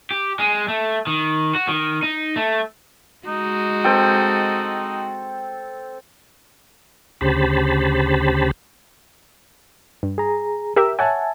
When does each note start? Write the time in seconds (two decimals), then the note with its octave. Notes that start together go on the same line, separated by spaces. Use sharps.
0.11 G4
0.39 G#3
0.68 A3
1.07 D#3
1.55 F#4
1.68 D#3
2.03 D#4
2.36 A3
3.27 G#3 D#4 F#4
3.84 C4 A4 G5
7.21 D2 C#3 G4 C5 A5 B5
10.03 G2
10.18 G#4 A#5
10.76 G4 A#4 E5 E6
10.99 C#5 E5 F#5 G#5 A5